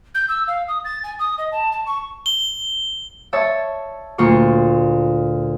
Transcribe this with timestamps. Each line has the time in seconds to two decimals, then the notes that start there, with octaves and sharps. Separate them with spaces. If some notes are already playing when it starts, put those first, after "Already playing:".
0.15 G6
0.28 E6
0.48 F5
0.68 D#6
0.85 A6
1.04 G#5
1.19 D#6
1.38 D#5
1.52 A5
1.72 A5
1.86 C#6
2.26 G7
3.33 C#5 E5 A5
4.18 D2 A#2 D4 F4 C#6